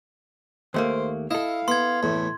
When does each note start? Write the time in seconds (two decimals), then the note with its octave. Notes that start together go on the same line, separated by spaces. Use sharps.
0.74 D#2 A3 A#3 C5
1.31 E4 A4 D#5 F5
1.68 B3 C6 G#6
2.03 E2 A2 A3